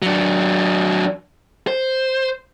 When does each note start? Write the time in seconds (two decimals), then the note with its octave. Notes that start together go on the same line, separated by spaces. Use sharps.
0.02 F#3 D4
1.67 C5